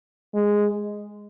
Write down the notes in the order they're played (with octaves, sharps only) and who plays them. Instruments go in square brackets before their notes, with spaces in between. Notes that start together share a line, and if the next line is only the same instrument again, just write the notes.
[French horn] G#3